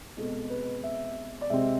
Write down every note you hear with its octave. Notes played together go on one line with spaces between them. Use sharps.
B2 G#3 C4 A4
B4
E5
D5
C3 G#3 C4 E5